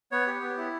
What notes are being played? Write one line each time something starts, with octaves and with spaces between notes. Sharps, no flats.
B3 C#5
G4
B3
E4